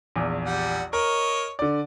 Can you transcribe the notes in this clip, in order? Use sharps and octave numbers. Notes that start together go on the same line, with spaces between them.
A#1 E2
G3 F#5
A#4 C#5 D#5
D3 D5